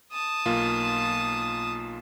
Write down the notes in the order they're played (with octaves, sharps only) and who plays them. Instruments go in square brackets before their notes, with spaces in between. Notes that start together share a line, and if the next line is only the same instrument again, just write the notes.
[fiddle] A5 D#6
[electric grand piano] B1 A#3 F4